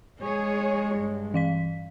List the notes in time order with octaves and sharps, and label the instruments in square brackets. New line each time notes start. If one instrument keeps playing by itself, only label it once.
[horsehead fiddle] G#3 [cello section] G#4 C#5
[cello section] G2
[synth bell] E3 F5 B6